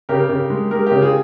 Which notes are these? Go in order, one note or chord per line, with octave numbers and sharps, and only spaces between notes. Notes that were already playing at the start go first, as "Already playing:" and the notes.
C#3 G4 A#4
C#3
G#3
G#3 G4 A#4
C#3 G4 A#4
F4 G#4